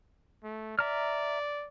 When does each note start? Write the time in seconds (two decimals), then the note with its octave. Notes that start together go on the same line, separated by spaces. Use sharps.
0.44 A3
0.79 D5 E5 A#5 F6